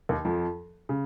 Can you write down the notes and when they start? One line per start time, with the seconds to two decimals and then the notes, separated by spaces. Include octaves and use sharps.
0.09 D#2 D#3
0.25 F2 F3
0.89 C#3